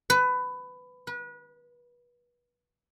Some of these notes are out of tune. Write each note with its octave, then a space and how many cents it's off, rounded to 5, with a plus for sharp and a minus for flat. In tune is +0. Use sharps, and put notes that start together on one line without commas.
B4 +20
B4 -30